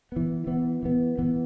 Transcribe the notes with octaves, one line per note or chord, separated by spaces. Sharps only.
E3 B3
E3 B3
E3 B3
E3 B3